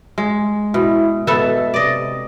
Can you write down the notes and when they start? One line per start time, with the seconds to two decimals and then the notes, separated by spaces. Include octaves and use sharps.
0.18 G#3
0.74 B2 E4
1.27 B2 B3 A4 E5
1.74 C3 D5 D#5